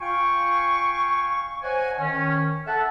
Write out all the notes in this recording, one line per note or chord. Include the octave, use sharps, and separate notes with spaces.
F4 F5 G5 G#5 C#6
C5 C#5 D#5 F#5 G#5
D#3 C#4
A4 E5 F#5 A5